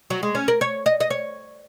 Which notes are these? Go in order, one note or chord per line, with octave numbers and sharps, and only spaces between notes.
F#3
G#3
C#4
A#4
C#5
D#5
D#5
C#5